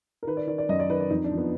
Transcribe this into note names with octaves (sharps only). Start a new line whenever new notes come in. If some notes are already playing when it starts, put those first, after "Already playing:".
A#4
D#3 B4
D5
D#3 D5
D5
F#2 D#5
D5
D#3 B4
D5
F2 D#4
D4
F3
B3